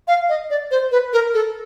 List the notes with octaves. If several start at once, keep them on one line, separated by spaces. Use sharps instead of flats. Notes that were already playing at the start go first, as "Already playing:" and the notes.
F5
D#5
D5
C5
B4
A#4
A4